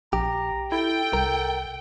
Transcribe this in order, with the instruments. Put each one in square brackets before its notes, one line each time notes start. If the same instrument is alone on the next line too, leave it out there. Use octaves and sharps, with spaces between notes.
[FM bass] A#1 [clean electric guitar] G4 [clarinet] A#5
[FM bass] E4 [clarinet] A4 [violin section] G5
[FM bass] C2 [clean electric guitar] A#4